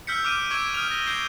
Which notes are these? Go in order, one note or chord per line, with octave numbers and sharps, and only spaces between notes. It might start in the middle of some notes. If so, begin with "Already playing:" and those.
E6 F6 G6 B6 C#7
D6 F6 D7 D#7
C#6 D6 E6 G#6 D7 D#7
D#6 F6 D#7 F7
A#6 G7
G6 C7 D7 D#7